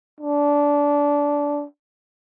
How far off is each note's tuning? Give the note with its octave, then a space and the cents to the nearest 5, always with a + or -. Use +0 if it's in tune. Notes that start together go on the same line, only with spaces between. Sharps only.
D4 -20